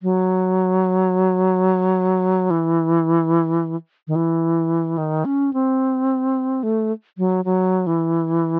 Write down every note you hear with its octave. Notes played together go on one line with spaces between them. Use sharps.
F#3
E3
D#3
E3
D#3
C#4
C4
A3
F#3
F#3
E3